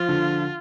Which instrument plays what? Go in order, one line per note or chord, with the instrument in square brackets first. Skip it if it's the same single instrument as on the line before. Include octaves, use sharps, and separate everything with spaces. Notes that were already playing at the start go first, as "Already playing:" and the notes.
Already playing: [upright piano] F3 [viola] F4
[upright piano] D3